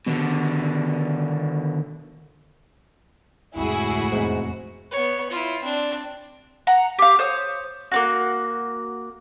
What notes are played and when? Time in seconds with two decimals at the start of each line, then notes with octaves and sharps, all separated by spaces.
0.06 B2 D3 D#3
3.56 F1 D2 A2 G#3 E4 F#4 G#4
4.12 F1 E2 G#2
4.91 B3 C#5
5.30 E4 F4
5.63 C4 D4
6.67 F#5 A#5
6.99 G4 F5
7.19 C5 C#5 D#6
7.92 A#3 C4 F#4